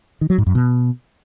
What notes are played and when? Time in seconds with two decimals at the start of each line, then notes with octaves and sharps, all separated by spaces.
0.21 D#3
0.30 F#3
0.38 G#2
0.47 F#2
0.55 B2